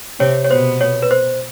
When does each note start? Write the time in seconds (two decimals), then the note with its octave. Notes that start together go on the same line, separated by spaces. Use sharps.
0.19 C3 C4 C#5
0.44 C#5
0.50 B2 B3 C5
0.81 C#5
1.03 B4
1.11 C5